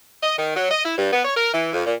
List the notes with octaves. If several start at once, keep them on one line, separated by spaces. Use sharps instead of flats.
D#5
D#3
F#3
D#5
E4
G2
B3
C#5
A#4
E3
F2
A#2